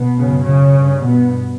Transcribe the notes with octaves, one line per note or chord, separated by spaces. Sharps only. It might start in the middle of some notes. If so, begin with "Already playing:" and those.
Already playing: B2 B3
F#2 C#3
C#3 C#4
G2
B2 B3